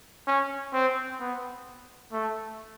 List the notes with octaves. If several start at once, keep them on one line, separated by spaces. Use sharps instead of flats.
C#4
C4
B3
A3